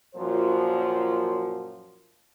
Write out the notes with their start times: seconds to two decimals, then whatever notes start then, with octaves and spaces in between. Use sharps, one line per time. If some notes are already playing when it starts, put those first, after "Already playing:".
0.15 F#2 A#2 F3 F#3 C5